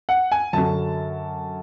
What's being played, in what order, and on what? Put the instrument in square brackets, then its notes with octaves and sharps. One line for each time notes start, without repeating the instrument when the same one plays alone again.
[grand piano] F#5
G#5
F#2 D3 F#3 A5